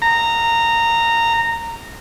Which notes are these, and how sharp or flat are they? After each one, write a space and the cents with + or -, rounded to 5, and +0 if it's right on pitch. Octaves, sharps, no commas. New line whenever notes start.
A#5 -15